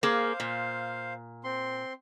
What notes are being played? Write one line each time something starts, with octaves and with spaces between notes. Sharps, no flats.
A#3 G#4 C5 F5
A#2
C4 C6